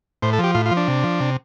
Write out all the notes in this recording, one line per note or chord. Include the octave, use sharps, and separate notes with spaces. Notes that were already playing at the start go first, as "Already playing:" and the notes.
A2 C5
A4
F3 G4
A2 F4
F4
F3
D4
C3
F3
C3